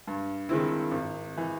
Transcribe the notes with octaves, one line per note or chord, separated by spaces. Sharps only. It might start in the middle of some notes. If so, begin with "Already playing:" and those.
G2
D#3 G#3 C4 E4
G#1
E3